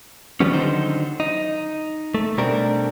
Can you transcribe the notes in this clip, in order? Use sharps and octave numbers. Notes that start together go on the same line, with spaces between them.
D#3 F3 G3 B3 C#4
D3 D#3 F#3 D#4 C5
D#4
A3
B2 G3 A3 C4 D4 A#4